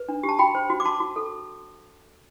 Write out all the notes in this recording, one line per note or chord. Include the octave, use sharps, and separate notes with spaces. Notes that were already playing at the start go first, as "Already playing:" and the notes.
Already playing: B4
D4
G4
A5
F#4 G5 B5
C5
F#4
D6
F#4 A5 C6
F#4
A4